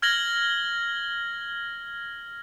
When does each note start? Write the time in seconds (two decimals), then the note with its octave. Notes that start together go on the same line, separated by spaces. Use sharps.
0.02 F6 G#6 A#6 F#7 G7